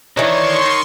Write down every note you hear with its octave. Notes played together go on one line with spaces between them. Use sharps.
D#3 E3 D4 D#4 C#5 C6 C#6